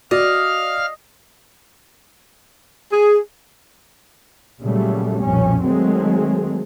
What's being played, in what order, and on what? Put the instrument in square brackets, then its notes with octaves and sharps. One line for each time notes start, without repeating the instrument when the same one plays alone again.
[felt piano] F#4 [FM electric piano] D5 [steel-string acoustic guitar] D#5 [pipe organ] F5 F6
[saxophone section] G#4
[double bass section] A#2 C#3 F#3 G3 A3
B1 F2 A#2 C#4
D#3 F#3 G#3 A3 C4